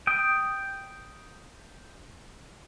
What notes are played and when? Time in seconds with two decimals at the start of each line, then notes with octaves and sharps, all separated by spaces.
0.07 G5 D#6